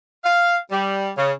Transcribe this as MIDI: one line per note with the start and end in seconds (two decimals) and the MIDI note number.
0.24 0.57 77
0.71 1.11 55
1.18 1.32 49